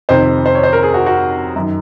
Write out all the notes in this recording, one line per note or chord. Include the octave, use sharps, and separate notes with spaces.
F2 C3 D#3 C5
C5
C#5
C5
A#4
G#4
F#4
F#4
F#2 D#3